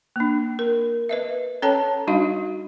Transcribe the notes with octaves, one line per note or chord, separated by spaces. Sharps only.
A#3 D4
A#4
B4 D#5 E5
C#4 A4 C#5 G5 A5 A#5
G3 D4 D#4 F#4 D#5 F5